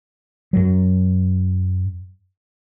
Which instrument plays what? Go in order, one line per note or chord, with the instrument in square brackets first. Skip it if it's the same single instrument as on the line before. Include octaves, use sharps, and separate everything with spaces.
[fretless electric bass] F#2 F#3